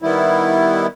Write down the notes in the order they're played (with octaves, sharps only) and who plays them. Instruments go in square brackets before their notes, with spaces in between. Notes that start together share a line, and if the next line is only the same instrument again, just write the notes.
[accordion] D#3 G3 B3 E4